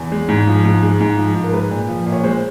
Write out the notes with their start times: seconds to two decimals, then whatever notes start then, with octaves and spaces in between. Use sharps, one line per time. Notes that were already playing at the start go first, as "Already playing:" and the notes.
Already playing: E2
0.12 G#3
0.28 G#2
0.47 F3
0.65 G#2
0.83 G#3
1.00 G#2
1.17 F3
1.35 G#2
1.44 A#4
1.52 G#3 B4
1.71 A#2
1.88 F3
2.06 A#2
2.12 C#5
2.24 G#3 C5